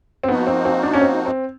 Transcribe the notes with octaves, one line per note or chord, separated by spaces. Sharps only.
C4
F3 A#3 B3 D#4 F#4
C4
C4
D4
C#4
C4
C4